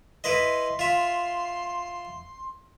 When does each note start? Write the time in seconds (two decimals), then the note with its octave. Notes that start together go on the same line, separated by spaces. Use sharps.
0.24 E4 B4 D#5 C6
0.79 F4 E5